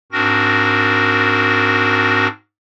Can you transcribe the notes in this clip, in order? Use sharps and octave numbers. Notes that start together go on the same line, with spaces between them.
G#2 C4 D4 F#4 A#4 A#6